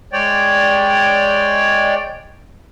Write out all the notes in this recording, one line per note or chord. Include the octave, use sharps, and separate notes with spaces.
G#3 C#5 D5 G5